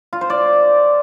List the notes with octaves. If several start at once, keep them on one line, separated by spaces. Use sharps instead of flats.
F4
C5
D5